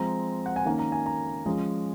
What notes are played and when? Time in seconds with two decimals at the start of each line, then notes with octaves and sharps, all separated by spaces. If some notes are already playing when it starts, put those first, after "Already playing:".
Already playing: F3 G#3 C4 A#5
0.46 F#5
0.56 G#5
0.65 D#3 A#3 C#4 A#5
0.79 A#5
0.92 G#5
1.06 A#5
1.46 F3 G#3 C#4